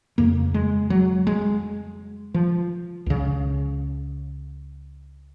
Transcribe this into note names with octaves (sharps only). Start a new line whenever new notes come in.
F2 C#3 A#3
G#3
F#3
G#3
F3
C#2 C#3